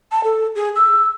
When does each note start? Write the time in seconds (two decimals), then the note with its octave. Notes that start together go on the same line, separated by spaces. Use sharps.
0.12 A5
0.24 A4
0.55 G#4
0.76 E6